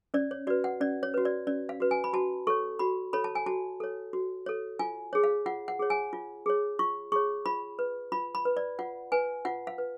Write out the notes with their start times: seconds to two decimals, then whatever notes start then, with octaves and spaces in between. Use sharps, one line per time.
0.14 C#4 D5
0.31 C#5
0.47 F#4 B4 D5
0.64 F#5
0.81 C#4 D5
1.03 C#5
1.14 F#4 B4
1.25 D5
1.47 C#4 D5
1.69 F5
1.80 F#4 B4
1.91 G#5
2.04 B5
2.13 F#4 A5
2.47 A4 C#5 C#6
2.79 F#4 B5
3.13 A4 C#5 B5
3.24 A5
3.35 G#5
3.46 F#4 A5
3.80 A4 C#5
4.13 F#4
4.46 A4 C#5
4.79 F4 G#5
5.13 G#4 C#5
5.24 F5
5.46 F4 F#5
5.68 F#5
5.79 G#4 C#5
5.90 G#5
6.13 F4
6.46 G#4 C#5
6.79 F4 C#6
7.12 G#4 C#5 C#6
7.46 F4 B5
7.79 B4
8.12 F4 B5
8.35 B5
8.45 B4
8.57 D5
8.79 F4 F#5
9.12 B4 G#5
9.45 F4 F#5
9.67 F5
9.78 B4